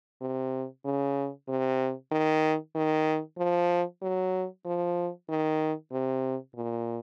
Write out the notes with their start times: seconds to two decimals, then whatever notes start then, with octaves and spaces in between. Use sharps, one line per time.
0.21 C3
0.85 C#3
1.48 C3
2.11 D#3
2.75 D#3
3.38 F3
4.02 F#3
4.65 F3
5.29 D#3
5.91 C3
6.55 A#2